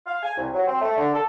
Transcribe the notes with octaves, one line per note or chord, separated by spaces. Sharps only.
F5
G#5
C2
F#3
C4
A3
D3
A4